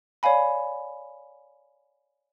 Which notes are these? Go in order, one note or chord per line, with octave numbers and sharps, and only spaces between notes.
C#5 D5 F5 G#5 B5